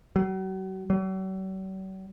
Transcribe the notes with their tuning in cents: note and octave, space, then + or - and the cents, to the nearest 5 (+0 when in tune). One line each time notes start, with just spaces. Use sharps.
F#3 +40
F#3 +45